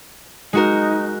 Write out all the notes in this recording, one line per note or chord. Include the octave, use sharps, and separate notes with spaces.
G#3 D#4 F#4 A#4